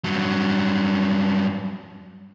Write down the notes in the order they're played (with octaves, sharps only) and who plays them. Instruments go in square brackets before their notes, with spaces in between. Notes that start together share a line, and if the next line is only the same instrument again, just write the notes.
[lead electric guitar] G2 F#3